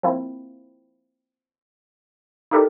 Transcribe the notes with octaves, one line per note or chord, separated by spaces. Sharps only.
F3 A#3 C4 E4
D#4 E4 G4 A4 A#4 D5